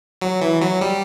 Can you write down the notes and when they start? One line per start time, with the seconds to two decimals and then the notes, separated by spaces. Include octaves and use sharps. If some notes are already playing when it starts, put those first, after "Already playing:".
0.22 F#3
0.41 E3
0.61 F#3
0.81 G3